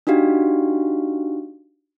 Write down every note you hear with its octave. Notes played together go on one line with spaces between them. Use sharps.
D4 D#4 F#4 G4 F5